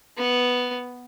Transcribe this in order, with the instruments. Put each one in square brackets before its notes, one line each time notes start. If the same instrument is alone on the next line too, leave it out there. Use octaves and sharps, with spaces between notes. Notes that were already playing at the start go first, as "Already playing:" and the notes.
[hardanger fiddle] B3